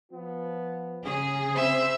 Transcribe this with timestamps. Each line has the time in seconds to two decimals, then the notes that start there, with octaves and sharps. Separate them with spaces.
0.12 F3 B3 F4
1.05 C#3 G#4
1.55 C4 C5 E5 B5 E6